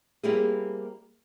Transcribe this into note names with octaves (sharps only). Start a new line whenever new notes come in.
G3 A#3 C4 E4 G4 G#4